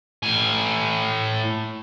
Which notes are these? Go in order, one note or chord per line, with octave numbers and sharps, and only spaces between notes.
A2 G#5